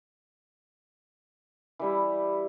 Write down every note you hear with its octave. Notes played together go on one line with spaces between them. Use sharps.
E3 G3 E4